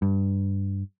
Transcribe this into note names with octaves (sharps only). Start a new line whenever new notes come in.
G2